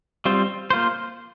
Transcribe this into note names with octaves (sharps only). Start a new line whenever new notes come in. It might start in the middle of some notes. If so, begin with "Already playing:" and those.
G3 C4 F4 C5
A#3 F4 C5